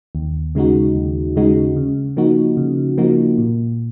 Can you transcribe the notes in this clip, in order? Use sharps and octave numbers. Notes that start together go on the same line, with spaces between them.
D#2
C#3 G#3 D#4 F#4
D#2
C#3 G#3 D#4 F#4
C#3
F3 A#3 D#4 F#4
C#3
F3 A#3 D#4 F#4
A#2